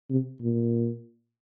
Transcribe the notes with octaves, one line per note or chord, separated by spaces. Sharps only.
C3
A#2